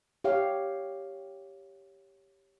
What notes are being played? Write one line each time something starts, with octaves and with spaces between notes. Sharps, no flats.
G4 C#5 F5